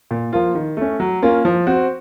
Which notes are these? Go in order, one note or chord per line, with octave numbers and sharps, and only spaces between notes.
A#2
F3 A#3 F4
D#3
A3 C#4
F#3
A#3 C#4 F4
F3
C4 F#4